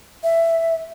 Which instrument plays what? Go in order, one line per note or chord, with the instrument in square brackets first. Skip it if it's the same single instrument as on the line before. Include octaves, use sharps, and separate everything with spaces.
[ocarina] E5